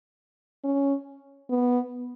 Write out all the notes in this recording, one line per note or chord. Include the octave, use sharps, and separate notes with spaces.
C#4
B3